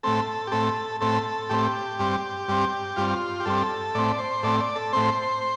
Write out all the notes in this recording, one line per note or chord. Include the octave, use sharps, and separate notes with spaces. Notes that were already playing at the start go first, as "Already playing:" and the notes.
A2 A3 C4 A4
G4
A2 A3 C4 A4
A2 A3 C4 A4
A2 A3 C4 G4
G2 G3 C4
G2 G3 C4
G2 G3 C4 F4
G4
G2 G3 C4 A4
A2 A3 C4 D5
C5
A2 A3 C4 D5
D5
A4
A2 A3 C4 C5